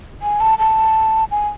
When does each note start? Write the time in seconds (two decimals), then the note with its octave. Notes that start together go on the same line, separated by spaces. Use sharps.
0.22 G#5
0.40 A5
0.59 A5
1.31 G#5